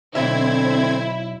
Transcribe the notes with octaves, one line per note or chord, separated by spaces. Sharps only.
B1 D3 C4 E4 E5 G#6